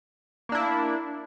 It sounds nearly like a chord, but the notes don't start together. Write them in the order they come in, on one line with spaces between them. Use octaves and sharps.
A#3 D4 E4